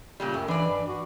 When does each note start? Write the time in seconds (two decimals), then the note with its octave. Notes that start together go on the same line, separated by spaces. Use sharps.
0.20 A#2 C#3 G3
0.34 F#2 A3
0.48 E3 D4 B4 D5
0.70 G2
0.87 F#4